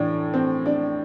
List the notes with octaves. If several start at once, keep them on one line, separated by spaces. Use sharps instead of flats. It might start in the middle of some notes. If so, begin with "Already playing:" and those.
Already playing: A2 E3 D4
C4
D4